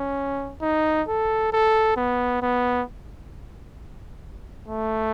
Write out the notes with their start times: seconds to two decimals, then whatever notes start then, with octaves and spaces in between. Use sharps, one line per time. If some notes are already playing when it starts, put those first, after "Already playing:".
Already playing: C#4
0.62 D#4
1.08 A4
1.53 A4
1.97 B3
2.42 B3
4.68 A3